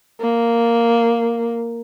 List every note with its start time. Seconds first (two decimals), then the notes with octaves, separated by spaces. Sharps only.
0.21 A#3